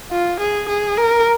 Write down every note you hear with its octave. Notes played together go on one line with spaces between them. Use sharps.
F4
G#4
G#4
A#4